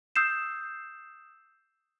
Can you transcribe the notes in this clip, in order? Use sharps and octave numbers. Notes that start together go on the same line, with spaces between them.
D#6 E6 G6 C7 E7